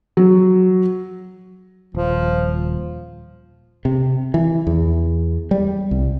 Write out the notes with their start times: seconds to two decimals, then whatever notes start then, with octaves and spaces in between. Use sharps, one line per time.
0.17 F#3
1.95 D#1 F3
3.85 C3
4.34 E3
4.67 E2
5.51 G3
5.91 C2